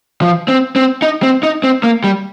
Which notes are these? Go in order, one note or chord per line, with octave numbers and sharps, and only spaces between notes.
F3
C4
C4
D#4
C4
D#4
C4
A#3
G3